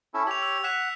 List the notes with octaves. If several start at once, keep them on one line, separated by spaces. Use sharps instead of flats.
C#4 E4 A4
G4 C#5 E6 F7
E6
F#5 F#6 B6 E7